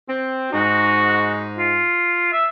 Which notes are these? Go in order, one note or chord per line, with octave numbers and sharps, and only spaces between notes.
C4
G#2 D#4 F#4
F4
E5